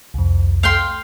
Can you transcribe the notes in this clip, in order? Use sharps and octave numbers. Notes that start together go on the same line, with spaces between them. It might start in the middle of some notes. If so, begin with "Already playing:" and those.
C2 F2
F5 G5 C6